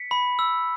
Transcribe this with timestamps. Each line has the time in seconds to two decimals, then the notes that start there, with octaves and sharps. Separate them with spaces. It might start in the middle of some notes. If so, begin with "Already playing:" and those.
Already playing: B6 C#7
0.11 B5
0.39 E6